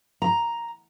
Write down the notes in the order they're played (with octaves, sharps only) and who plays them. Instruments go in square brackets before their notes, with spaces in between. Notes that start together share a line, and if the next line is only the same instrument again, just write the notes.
[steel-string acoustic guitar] A#5